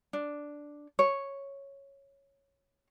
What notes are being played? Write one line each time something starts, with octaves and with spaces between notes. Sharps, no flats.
D4
C#5